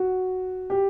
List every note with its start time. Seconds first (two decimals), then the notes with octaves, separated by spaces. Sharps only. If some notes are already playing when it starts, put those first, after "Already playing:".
Already playing: F#4
0.70 G4